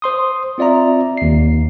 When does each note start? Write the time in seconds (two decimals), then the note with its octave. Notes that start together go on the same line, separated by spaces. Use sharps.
0.02 C5 C6 D#6
0.58 C4 F4 D5 E5 A#5
1.17 D#2 C7